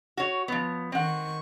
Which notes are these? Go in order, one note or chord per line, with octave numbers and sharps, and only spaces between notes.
F#4 C#5
F3 B3
D#3 C4 F#5 C#6